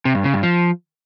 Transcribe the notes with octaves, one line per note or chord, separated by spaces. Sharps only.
C3
G2
C#3
G2
F3